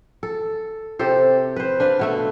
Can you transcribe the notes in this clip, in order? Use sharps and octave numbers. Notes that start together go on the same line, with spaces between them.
A4
C3 G4 A4 C5
B4 C5
D4 B4 F5
B2 A3 E5